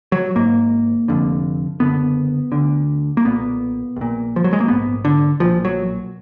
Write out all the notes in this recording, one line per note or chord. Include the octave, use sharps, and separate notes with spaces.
F#3
G#1 G#2 A#3
F1 F2 D3
F#1 F#2 D3 B3
D2 D3
A#3
B1 A#2 B3
A#1 A#2
F3
F#3
G#3
A#3
A#1 G#2 B3
D3
B1 A#2 F3
F#3